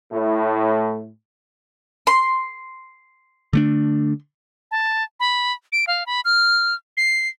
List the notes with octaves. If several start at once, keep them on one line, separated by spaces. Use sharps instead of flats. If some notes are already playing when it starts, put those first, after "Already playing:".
A2
C6
D3 A3 D4
A5
B5
D7
F5
B5
F6
C7